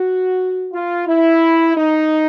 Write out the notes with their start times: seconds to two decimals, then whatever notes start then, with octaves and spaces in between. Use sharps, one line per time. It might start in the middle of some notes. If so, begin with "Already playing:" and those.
Already playing: F#4
0.72 F4
1.07 E4
1.76 D#4